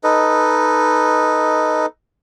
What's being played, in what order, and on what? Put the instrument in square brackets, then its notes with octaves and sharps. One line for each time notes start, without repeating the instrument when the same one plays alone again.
[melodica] D#4 A4 B4 D#5